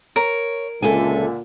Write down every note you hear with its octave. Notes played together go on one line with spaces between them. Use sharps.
A#4 C#5
C#2 A#2 D3 A4 E5 G#5